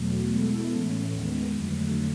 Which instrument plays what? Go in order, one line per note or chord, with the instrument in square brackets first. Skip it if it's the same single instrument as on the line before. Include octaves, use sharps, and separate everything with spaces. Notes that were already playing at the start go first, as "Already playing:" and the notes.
Already playing: [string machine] E2 B2 F#3 A3
B2 G#3 B3 E4 A4
A2 E3 A3 C#4
D#2 D#3 G#3 B3
F2 D3 F#3 A3